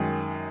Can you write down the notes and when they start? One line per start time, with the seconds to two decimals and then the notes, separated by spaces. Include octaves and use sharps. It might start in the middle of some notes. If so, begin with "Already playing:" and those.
Already playing: F#2 D#3 G#3